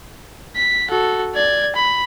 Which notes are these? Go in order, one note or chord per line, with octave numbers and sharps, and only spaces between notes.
B6
F#4 A4
D5 G#6
B5